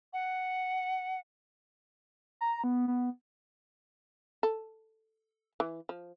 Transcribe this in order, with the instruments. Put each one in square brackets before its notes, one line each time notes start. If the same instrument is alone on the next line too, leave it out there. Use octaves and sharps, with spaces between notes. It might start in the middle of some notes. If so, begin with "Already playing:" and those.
[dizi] F#5
[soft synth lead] A#5
B3
B3
[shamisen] A4
E3
F3